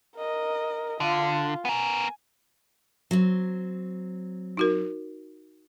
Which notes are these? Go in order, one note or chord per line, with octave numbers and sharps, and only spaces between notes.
A#4 D#5
D3 F4
B3 A#4 G#5
F#3 C4
D#4 F#4 A#4